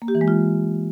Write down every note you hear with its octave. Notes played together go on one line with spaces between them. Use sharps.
A#3
G4
E3
G#3
F4